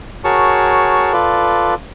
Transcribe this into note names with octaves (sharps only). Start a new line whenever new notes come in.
F#4 G#4 A#4 C#5 A5 C#6
F4 A4 B4 D5